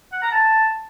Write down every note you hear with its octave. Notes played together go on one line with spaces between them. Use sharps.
F#5
A#5
A5